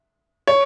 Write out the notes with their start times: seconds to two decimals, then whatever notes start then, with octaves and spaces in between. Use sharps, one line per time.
0.47 C#5